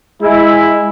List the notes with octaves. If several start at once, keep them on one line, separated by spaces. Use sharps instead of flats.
G#3 E4